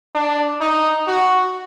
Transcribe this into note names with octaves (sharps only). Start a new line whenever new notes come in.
D4
D#4
F#4